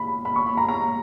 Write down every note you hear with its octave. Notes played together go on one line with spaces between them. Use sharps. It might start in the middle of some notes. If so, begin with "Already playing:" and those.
Already playing: B5
B5
C#6
B5
A#5
A#5